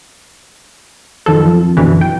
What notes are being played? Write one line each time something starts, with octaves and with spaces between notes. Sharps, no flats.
F#2 D#3 F3 A4
F2
F#2 B2 D3 E3
G5